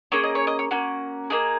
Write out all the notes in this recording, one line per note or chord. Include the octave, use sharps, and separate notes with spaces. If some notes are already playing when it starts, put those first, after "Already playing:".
A#3 C#4 G#4 C#5
D#5
C#5
D#5
C#5
A#3 C#4 F#4
A#3 D#4 G#4